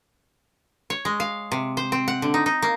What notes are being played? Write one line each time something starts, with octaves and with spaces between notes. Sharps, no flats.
C#5
G#3
F5
C3
C5
C4
F#5
D3
D#4
D#4
A#3